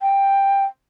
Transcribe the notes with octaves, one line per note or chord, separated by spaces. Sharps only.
G5